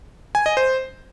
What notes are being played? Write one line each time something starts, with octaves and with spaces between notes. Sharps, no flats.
G#5
D#5
C5